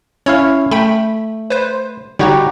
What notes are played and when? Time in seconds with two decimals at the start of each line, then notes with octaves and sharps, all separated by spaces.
0.26 C#4 E4 C#5 F5
0.71 A3 G5 B5
1.50 B4 C5
2.19 D3 G3 D#4 F#4 G4 C#5